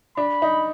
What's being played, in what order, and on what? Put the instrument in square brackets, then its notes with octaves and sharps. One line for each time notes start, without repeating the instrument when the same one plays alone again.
[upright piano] D4 [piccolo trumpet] B5
[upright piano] D#4